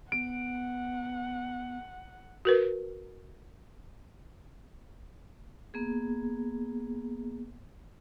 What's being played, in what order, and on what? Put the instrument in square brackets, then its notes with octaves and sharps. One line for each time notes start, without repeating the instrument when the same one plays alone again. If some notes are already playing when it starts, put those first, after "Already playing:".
[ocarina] B3 [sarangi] F#5 [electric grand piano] D7
[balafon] F#4 A#4 B4
[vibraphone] A#3 B3 G#4